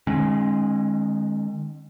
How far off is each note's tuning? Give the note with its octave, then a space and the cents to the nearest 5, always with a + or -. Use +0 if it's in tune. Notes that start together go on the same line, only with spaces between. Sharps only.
D#3 -35 G#3 +0 C#4 -45